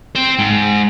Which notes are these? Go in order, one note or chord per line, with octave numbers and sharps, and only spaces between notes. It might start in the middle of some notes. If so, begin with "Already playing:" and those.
C5 G5
G#2